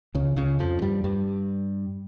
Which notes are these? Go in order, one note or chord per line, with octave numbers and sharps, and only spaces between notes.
C#2 C#3
C#2 C#3
F2 F3
G2 G3
G2 G3